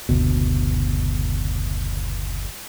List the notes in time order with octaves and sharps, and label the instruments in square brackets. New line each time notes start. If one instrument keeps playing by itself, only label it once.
[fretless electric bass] F#1 D2 B2